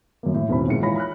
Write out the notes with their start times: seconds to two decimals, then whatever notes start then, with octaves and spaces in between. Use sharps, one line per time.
0.23 F#2 A#3
0.34 A2
0.49 E1 B2 D#3 C4 E4 B5
0.68 A#1 G#2 D#3 G#3 C#7
0.82 E3 F4 C#5 B5 A#6
0.95 B5 F6 F#6